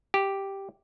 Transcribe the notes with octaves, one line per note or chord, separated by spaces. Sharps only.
G4